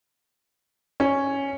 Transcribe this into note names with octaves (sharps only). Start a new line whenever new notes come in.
C#4